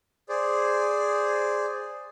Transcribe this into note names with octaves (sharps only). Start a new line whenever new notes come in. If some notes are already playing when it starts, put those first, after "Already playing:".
G#4 C5 D5